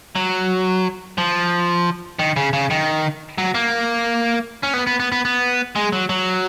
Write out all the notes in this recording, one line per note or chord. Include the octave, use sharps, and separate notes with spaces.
F#3
F3
D#3
C#3
C#3
D#3
F#3
A#3
C#4
B3
B3
B3
B3
B3
G#3
F#3
F#3